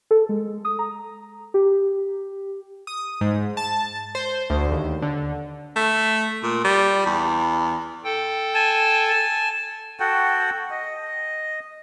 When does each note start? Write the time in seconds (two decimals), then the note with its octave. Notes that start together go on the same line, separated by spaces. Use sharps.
0.11 A4
0.29 G#3
0.65 D#6
0.79 A#5
1.54 G4
2.87 D#6
3.21 G#2
3.57 A5
4.15 C5
4.50 D2
4.72 D#2
5.02 D3
5.76 A3
6.43 A#2
6.65 G3
7.06 E2
8.04 A4 G5
8.54 G#5 A5
10.00 F#4 A4 F#5 G5
10.70 D#5